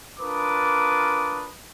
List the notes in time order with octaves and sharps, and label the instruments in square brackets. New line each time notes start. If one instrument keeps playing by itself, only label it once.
[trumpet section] D4 F4 A#4 B4 D6 D#6